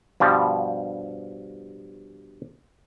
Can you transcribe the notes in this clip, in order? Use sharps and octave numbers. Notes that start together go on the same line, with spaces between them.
G2 B2 F3 G3